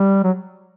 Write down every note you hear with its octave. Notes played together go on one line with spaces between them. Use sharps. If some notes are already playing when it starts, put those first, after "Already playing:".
Already playing: G3
F#3